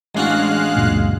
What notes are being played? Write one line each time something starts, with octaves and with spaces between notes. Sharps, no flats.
A1 G#3 D4 F#4 F5 F#6
C#2 F#2 A#2